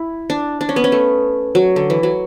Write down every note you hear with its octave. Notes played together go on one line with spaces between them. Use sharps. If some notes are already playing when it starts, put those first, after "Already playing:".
Already playing: E4
D4
D4
C#4
B3
C#4
A3
F#3
D3
E3
F#3